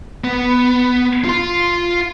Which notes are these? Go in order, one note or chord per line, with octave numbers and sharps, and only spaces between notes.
B3
F4 C6